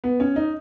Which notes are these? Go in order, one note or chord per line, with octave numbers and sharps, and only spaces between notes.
B3
C#4
D#4